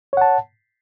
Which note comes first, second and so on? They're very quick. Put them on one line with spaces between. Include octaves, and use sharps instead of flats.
C#5 F#5 A5